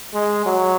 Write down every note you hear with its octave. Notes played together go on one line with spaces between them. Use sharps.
G#3
F#3